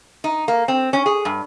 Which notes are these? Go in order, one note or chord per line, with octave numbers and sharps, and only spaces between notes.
D#4
A#3
C4
C#4
G#4
G2